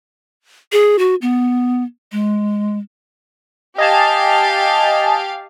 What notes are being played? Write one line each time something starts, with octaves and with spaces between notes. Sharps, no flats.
G#4
F#4
B3
G#3
G4 D#5 F5 G#5 A5